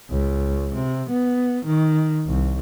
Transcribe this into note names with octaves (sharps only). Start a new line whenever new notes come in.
C#2
C3
B3
D#3
C2